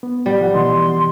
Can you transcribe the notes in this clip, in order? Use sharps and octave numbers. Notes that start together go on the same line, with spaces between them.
B3
A2 G3
F3 F#5
B2 E3 D#5 C6